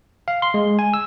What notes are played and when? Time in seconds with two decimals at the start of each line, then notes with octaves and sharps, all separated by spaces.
0.28 F5
0.42 C6
0.54 G#3
0.79 G#5
0.94 E6